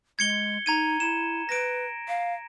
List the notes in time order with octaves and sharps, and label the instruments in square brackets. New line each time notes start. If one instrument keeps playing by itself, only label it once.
[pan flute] G#3 [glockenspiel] G#6 C#7 G7
[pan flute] D#4 [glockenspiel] A#5 G#6 D#7
[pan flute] E4 [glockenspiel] E7
[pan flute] B4 [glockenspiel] A#6 D7
[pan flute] F5